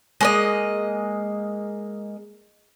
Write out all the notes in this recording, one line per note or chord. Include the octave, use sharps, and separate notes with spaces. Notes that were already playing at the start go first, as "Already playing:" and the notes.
G#3 A#3 D#5